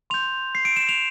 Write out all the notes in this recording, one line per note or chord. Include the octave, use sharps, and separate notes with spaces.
C6 G6 F7
C7
D7
E7
F7